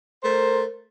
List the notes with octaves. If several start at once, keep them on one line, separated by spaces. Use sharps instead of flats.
A3 A#4 C5